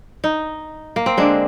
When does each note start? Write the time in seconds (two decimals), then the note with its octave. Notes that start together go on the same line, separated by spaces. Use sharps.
0.24 D#4
0.96 A#3
1.06 C4
1.17 D3 G#3 D4